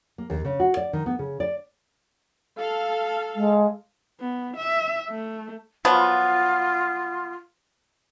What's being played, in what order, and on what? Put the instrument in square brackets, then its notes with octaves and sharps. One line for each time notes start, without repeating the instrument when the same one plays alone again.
[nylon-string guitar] A#3
D#2
C#3
F#4
D5
D#3
B3
C#3
D5
[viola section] A4 F5
[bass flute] G#3
[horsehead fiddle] B3
E5
A3
[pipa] F3 F#3 B3 [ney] F4